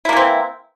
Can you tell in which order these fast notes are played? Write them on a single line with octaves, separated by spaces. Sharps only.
E4 A#3 E3 C4